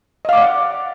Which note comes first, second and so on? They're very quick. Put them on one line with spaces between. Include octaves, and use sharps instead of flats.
D#5 F5 D6 D5 F#5